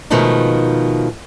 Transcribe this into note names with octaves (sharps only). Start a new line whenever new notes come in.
B2 D#3 F3 G#3 A3 D#4